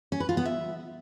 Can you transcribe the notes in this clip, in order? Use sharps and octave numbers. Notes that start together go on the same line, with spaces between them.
C#4
B4
F4
B3
E5